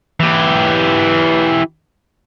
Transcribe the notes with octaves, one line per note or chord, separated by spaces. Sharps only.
E3 G4